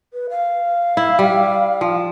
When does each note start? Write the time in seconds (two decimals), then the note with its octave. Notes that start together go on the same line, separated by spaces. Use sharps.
0.13 B4
0.30 F5
0.97 E4
1.19 G3
1.81 F3